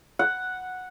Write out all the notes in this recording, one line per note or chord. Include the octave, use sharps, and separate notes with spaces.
F#5